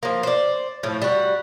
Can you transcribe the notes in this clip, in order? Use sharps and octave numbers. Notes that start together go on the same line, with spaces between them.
F3 A#3
C5 D5
A2 F3
G3 F#4